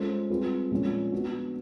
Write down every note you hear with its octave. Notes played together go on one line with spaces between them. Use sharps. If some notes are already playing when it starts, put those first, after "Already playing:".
Already playing: G#3 C#4 F4 A4 C5
G3 C4 F4 G#4 B4
A#2 F3 G#3 C#4
B3 D4 F#4